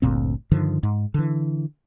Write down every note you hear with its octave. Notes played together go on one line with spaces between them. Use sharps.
G1 D2 A#2 C4
G2 D3 D#3 F3
G#2
D3 E3